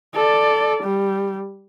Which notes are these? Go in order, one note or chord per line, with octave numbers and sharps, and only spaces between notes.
A4 D5
G3